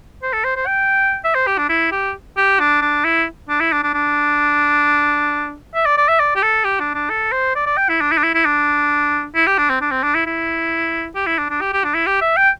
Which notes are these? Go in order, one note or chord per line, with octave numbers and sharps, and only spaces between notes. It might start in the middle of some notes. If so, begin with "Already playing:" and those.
C5
A4
C5
C5
G5
E5
C5
G4
D4
E4
G4
G4
D4
D4
E4
D4
E4
D4
D4
D4
E5
D5
D5
E5
D5
G4
A4
G4
D4
D4
A4
C5
D5
D5
G5
E4
D4
E4
D4
E4
E4
D4
E4
G4
D4
C4
D4
C4
D4
E4
E4
G4
E4
D4
D4
G4
G4
D4
E4
G4
E5
G5